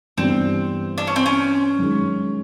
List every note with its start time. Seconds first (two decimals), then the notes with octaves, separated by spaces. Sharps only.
0.18 G2 E3 G3 B3 C4
0.98 D4
1.07 C#4
1.16 C4
1.26 C#4
1.78 F#2 D#3 G#3